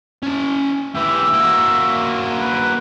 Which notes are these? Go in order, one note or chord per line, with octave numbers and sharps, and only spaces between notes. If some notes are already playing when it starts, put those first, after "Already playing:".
C#4 A5
E3 G4 E5
A#3 F#4
B4